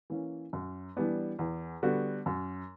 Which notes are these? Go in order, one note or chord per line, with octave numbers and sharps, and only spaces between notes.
E3 A#3 C#4
F#2
E3 G3 B3 D4
E2
D3 G3 B3 F#4
F#2